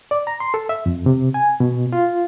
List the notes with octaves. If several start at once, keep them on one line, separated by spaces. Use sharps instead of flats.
D5
A#5
C6
A4
E5
F2
C3
G#5
B2
F4